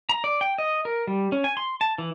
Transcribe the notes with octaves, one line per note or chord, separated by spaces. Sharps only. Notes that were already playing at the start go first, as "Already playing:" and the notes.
A#5
D5
G5
D#5
A#4
G3
C#4
G#5
C6
A5
E3